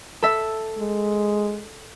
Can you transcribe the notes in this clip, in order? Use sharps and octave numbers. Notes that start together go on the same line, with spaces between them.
A4 E5
G#3